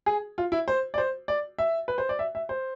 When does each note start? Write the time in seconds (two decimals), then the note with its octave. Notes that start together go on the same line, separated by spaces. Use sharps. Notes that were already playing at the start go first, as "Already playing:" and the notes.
0.06 G#4
0.38 F4
0.52 E4
0.68 C5
0.94 D5
0.98 C5
1.28 D5
1.59 E5
1.88 B4
1.98 C5
2.09 D5
2.19 E5
2.35 E5
2.49 C5